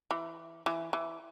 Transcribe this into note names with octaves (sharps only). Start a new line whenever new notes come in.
E3
E3
E3